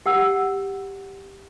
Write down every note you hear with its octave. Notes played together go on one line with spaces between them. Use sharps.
G4 F#5 E6